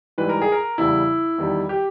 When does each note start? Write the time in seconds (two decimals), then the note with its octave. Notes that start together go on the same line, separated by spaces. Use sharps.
0.18 G#2 E3 G3 B4
0.29 A#4
0.42 G#4
0.52 A#4
0.78 E2 C#3 G3 E4
1.38 E2 D#3 G3
1.69 G4